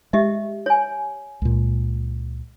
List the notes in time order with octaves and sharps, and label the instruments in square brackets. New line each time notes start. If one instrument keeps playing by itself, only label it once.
[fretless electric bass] G#3 [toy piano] G4 D#5 E5
[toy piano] C#5 G#5
[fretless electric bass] C#2 A#2